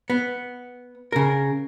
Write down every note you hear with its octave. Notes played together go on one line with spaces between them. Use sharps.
B3
C#3 A#4